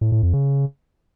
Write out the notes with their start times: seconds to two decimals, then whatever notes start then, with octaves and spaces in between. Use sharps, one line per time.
0.01 A2
0.12 A2
0.23 F2
0.33 C#3